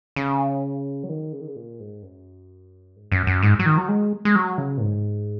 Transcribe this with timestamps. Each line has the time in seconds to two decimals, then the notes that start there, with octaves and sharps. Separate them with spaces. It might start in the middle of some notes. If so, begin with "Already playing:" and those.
0.16 C#3
1.04 F#3
1.09 D#3
1.33 C#3
1.41 D#3
1.48 C#3
1.56 A#2
1.80 G#2
2.02 F#2
2.96 G#2
3.12 F#2
3.27 F#2
3.43 G#2
3.59 F#3
3.66 D#3
3.77 F#3
3.88 G#3
4.25 G#3
4.36 F#3
4.58 C#3
4.78 A#2
4.81 G#2